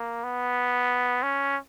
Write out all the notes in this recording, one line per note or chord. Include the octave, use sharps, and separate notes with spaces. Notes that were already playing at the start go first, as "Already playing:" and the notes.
Already playing: A#3
B3
C#4